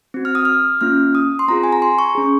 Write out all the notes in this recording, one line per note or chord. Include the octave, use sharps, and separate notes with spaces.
C4 F#4
F6
D#6
F6
A#3 C#4 F4 F6
D#6
C6
C4 F4 G#4 A#5
G#5
A#5
C6
C#6
C#4 G#4